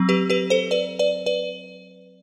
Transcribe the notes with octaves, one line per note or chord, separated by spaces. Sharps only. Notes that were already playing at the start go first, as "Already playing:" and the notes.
Already playing: F#3 C4
G4 B4
G4 B4
A4 C5
B4 D5
B4 D5
B4 D5